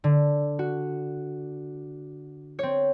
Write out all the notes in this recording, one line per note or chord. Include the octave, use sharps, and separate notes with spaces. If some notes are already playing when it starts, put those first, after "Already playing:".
D3
F#4
C4 C#5